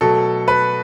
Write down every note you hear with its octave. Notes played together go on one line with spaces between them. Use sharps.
B2 F#3 A3 A4
B4